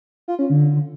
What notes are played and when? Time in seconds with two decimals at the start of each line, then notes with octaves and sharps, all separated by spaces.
0.28 F4
0.39 C#4
0.50 D3